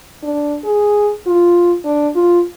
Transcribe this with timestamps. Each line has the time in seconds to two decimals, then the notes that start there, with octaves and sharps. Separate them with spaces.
0.23 D4
0.64 G#4
1.27 F4
1.85 D4
2.16 F4